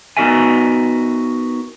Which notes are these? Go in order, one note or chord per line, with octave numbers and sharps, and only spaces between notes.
B3 D#4 F#4 A#4 E5 G#5